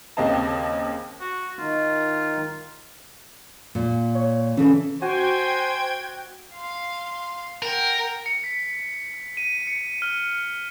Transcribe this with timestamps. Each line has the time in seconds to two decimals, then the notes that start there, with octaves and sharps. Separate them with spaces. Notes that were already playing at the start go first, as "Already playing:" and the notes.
0.17 D#2 C#3 C4 D#5 F5 A5
1.21 F#4
1.59 D#3 D#4 F4
3.75 A#2
4.15 C#5
4.57 C#3 E3 C#4 A4
5.02 F#4 C5 G5 G#5 G#6
6.54 F5 C6
7.63 A#4 F#5 G5
8.26 C#7
8.44 B6
9.37 D#7
9.67 C#7
10.02 F6